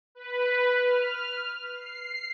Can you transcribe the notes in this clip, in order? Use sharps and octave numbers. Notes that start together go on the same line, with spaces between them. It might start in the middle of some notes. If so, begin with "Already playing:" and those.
B4
F6
C7